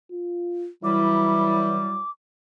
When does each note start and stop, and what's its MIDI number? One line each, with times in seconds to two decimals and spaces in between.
0.12 0.68 65
0.84 1.81 52
0.84 1.98 54
0.84 1.98 55
0.84 2.02 64
0.84 2.11 86